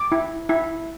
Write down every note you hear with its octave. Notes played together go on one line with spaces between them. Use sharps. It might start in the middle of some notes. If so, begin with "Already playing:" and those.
Already playing: D6
E4
E4